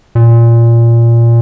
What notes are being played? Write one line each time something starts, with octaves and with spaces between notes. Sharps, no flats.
A#2